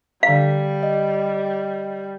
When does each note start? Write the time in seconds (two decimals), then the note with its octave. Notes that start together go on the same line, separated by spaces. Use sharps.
0.23 D3 G3 F5 A#5 B6
0.83 D#5